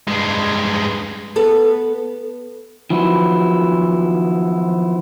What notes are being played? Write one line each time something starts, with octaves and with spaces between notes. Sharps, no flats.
G2 G#3
B3 A4
D#3 F3 F#3 B3 E4